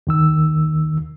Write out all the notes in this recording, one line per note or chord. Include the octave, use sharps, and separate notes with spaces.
D#2 D#3 E6